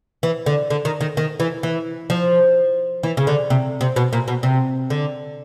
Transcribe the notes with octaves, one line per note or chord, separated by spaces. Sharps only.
E3
D3
D3
D#3
D#3
D#3
E3
E3
F3
E3
C#3
D3
C3
C3
B2
A#2
B2
C3
D3